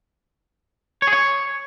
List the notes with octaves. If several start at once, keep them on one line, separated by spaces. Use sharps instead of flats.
C#5
G#4
C#5